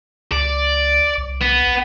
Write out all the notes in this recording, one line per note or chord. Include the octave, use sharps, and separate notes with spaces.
C#2 D5
C2
B3
B1